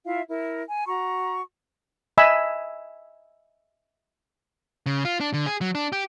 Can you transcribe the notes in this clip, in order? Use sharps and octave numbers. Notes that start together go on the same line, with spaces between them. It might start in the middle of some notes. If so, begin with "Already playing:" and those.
E4 F4 E5 F5
E4 A#4
G#5
F#4 A#5 C#6
D#5 E5 G#5 B5 E6
C#3
F4
D4
D3
G#4
F#3
D4
G4